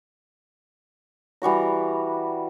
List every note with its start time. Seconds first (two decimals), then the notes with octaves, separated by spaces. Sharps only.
1.42 E3 G3 F#4 A#5